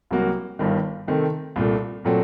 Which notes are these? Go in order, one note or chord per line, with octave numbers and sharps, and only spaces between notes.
C2 C3 F#3 A#3 F#4
G1 G2 D#3
C3 D#3 A3 C4
C2 A#2 A3
A#2 F#3 A3 C4